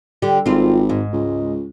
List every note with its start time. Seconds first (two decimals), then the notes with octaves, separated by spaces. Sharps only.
0.22 D3 G3 G4
0.46 G#1 C4 F4
0.89 G#2
1.13 C#2